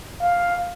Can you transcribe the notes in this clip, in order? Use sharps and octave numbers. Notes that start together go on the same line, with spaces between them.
F5